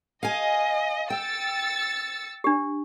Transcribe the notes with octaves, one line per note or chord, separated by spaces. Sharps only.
D#5 F5 G#5
G5 E6 A6 C#7
D4 G4